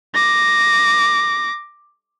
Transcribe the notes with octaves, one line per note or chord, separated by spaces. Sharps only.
D6 A#6